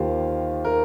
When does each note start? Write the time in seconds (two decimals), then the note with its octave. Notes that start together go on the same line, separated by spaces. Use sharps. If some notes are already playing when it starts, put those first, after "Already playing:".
Already playing: D#2 D#3 A#3 F4 G4 C5
0.65 A#4